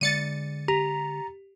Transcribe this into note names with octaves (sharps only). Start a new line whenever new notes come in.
D3 G#3 D5 A6 C#7 D#7
G4 A#5